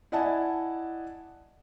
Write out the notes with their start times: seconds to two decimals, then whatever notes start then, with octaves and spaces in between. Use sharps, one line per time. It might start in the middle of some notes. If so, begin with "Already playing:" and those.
0.12 E4 D5 D#5 F#5 G#5 A5